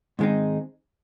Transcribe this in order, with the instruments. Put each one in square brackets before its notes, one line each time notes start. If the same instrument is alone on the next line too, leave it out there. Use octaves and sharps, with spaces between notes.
[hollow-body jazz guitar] G#2 D#3 G#3 C4 D#4